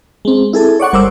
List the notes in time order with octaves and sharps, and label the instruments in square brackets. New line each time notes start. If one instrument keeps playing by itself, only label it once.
[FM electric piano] G#3 C4
E4 G#4 A4
C#5 D5 F#5 C#6
G1 G3 A#4 C5 D6 E6